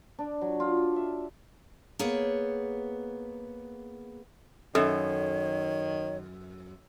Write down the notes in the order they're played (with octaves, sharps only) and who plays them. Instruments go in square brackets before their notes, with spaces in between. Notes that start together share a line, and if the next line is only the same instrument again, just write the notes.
[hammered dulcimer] D4
F#3
F4
E5
[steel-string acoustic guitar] A#3 B3 G#4 C#5
[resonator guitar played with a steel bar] F#2 [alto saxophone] D#3 [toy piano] A4 [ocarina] C#5